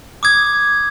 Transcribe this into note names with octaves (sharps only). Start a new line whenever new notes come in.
D6 D#6 G#6